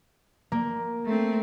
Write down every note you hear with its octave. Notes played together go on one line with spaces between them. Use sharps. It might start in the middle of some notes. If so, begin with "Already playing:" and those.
A#3
A3 C4